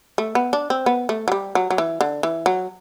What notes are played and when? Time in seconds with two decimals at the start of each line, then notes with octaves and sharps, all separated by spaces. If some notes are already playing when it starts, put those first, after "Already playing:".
0.18 A3
0.35 B3
0.53 D4
0.70 C4
0.86 B3
1.09 A3
1.28 F#3
1.32 G3
1.55 F#3
1.70 F#3
1.78 E3
2.01 D3
2.23 E3
2.46 F#3